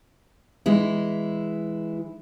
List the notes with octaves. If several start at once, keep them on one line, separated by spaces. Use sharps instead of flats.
E3 G#3 E4